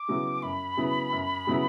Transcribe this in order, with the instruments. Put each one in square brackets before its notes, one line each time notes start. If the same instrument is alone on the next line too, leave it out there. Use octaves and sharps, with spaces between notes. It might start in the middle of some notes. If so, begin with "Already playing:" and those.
Already playing: [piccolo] D6
[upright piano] C#3 F#3 B3 E4
[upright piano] F#2 [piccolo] B5
[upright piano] C#3 F#3 B3 E4
F#2
C#3 F#3 B3 E4